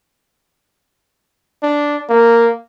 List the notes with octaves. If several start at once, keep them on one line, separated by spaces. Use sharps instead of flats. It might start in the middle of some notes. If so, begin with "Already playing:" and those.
D4
A#3